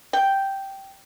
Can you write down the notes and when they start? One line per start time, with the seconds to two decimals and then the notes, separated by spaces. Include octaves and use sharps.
0.13 G5